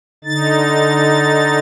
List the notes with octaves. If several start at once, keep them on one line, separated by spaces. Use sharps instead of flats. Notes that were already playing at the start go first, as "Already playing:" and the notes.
D3 D#4 A6